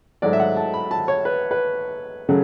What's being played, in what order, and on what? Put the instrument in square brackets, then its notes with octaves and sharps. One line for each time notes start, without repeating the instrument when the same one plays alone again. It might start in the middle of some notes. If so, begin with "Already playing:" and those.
[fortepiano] G#2 F#3 A3 D5
E5
F#5
A5
B5
A5
C#5
B4
B4
C#3 F#3 A3